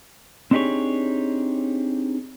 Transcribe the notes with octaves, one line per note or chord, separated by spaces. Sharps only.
C4 D4 D#4 G4 G#4 C#5